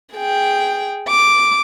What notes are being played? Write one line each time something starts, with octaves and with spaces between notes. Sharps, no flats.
G#4 G5
D6